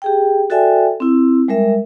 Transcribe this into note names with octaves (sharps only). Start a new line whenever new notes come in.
G4 G#4 G5
F#4 A4 D5 E5 G5 G#5
C4 E4
G3 G#3 A#4 E5